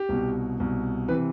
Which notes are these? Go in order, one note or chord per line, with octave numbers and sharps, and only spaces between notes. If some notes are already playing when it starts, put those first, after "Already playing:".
Already playing: G4
C2 B2
C2 B2
C3 E3 B4